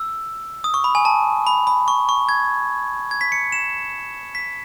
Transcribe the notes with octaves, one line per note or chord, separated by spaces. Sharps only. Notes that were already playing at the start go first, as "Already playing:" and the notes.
Already playing: E6
D#6
C#6
B5
G#5
A5
B5
B5
C#6
C#6
G#6
G#6
B6
C#7
E7
B6